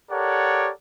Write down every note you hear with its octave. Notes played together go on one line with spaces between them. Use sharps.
G4 A4 A#4 C#5 D5 F#5